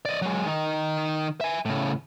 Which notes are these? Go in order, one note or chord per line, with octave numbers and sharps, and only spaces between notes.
D5 D#5
F#3 G#3
D#3 D#4
E5 G#5
A2 C#3